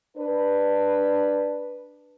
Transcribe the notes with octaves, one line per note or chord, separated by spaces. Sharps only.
D4 B4